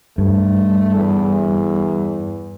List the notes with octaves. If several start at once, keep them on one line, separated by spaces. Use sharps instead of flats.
G2 A3
E2